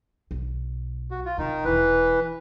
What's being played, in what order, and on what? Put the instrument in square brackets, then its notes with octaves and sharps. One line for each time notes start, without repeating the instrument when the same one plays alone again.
[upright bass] B1
[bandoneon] F#4
F4
[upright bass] C3 [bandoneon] D#3 D#4
[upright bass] E1 [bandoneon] E3 B4